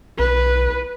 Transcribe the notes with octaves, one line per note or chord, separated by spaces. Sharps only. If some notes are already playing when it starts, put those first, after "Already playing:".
B1 B4